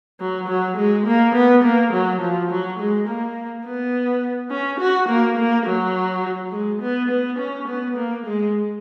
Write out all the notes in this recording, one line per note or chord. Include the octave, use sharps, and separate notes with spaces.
F#3
F#3
G#3
A#3
B3
A#3
F#3
F3
F#3
G#3
A#3
B3
C#4
F#4
A#3
A#3
F#3
G#3
B3
B3
C#4
B3
A#3
G#3